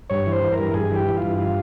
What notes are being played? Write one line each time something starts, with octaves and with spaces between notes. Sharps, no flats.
G2 C#5
E3
C5
E3
A#4
G2
G2 G#4
E3
G4
E3
G2 F4
F4